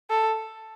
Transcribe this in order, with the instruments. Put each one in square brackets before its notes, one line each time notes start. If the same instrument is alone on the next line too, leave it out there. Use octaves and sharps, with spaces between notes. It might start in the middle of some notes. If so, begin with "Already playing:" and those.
[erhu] A4